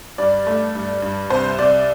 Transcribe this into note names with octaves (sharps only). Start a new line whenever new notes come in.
G2 D5
A3
G2
G2
C2 C5
C2 D5